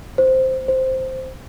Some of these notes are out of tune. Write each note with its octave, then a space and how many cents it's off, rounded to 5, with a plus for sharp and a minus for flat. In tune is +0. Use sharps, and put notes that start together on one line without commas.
C5 +0
C5 +0